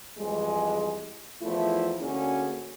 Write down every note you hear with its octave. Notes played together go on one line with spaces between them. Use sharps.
F2 E3 G3 G#3
E2 F3 A3 E4
D2 A#3 C#4 D4 F#4 G#4